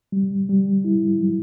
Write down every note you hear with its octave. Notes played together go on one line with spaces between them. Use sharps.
G3
G3
E4
F#3